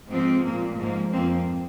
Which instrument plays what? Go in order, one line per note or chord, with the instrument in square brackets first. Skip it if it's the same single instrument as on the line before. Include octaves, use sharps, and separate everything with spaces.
[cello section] G#2 F3 G#3 C4
A#2 A#3
G#2 F3 A#3
F2 F3 A#3 C4